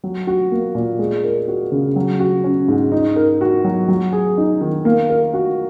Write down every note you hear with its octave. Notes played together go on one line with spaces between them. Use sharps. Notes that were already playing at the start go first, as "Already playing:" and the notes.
F#3
F#4
A#3
A#2
G#3
A#4
F#4
C#3
F#3
F#4
C#4
G#2
D#4
A#4
F#4
F#3
F#3
G#4
D#4
D#3
A#3
A#4
F#4